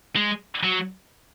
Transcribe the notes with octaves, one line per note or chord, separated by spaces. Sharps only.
G#3
F#3